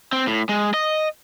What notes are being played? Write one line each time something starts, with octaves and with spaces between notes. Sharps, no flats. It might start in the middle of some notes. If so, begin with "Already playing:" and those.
C4
A2
G#3
D#5